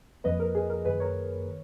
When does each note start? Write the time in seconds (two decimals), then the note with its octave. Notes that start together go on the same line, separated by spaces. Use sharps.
0.24 F2 F3 A#3 B4 D#5
0.40 A#4
0.55 G#4
0.70 A#4
0.85 F#2 D#3 A#3 G#4 B4
1.00 A#4 C#5
1.46 D#3